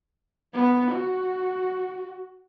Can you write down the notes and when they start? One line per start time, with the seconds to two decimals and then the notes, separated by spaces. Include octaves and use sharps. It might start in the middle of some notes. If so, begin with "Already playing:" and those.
0.54 B3
0.91 F#4